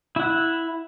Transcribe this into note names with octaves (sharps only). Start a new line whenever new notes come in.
E4 F#5